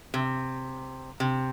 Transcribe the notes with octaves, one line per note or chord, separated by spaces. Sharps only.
C3
C3